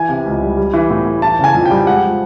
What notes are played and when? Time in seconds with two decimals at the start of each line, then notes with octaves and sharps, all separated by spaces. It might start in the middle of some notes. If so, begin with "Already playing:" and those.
Already playing: E3 G#5
0.09 C3
0.26 C#2
0.42 G3
0.57 G3
0.74 E3
0.90 A2
1.06 A2
1.22 E3 A5
1.39 C#3 G#5
1.55 F2
1.66 G5
1.70 G3
1.77 G5
1.87 G#3 F#5
2.03 F3